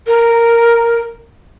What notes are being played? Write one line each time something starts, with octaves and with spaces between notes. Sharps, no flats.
A#4